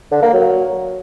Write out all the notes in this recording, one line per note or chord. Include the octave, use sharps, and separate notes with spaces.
D3
A#3
F#3